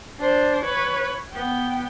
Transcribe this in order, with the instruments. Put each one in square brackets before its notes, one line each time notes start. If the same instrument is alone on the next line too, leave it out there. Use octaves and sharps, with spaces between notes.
[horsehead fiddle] D4 C5
B4 C#5
B3 G5